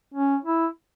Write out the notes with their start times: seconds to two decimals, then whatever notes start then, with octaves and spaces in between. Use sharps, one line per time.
0.14 C#4
0.45 E4